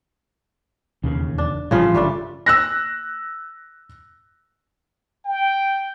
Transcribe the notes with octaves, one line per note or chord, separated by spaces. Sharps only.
E1 D#2 C#3
D4
A1 A2 C#3 F3 G3 F4
F#1 G3 A3 D4
E6 F#6 A#6
G5